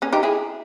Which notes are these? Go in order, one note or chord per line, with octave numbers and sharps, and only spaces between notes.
A#3 C#4
D#4 G4
E4 G#4